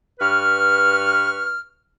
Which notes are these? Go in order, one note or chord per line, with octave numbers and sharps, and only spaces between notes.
G2 B4 C#6 F6